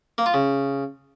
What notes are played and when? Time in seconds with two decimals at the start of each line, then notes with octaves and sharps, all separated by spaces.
0.18 A#3
0.26 F4
0.34 C#3